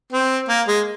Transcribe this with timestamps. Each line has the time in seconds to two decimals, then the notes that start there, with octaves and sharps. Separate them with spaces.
0.13 C4
0.49 A#3
0.68 G#3